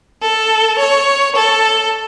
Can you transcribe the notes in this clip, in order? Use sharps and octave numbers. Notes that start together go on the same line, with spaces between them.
A4
C#5
A4